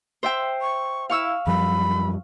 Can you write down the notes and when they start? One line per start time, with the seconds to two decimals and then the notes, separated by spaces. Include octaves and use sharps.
0.23 C5 E5 G5
0.61 C#6
1.10 E4 F5 C#6 E6
1.47 F#2 F3 G3 B5